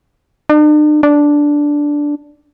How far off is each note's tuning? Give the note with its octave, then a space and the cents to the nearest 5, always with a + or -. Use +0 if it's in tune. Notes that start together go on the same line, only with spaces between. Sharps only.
D4 +45
D4 -5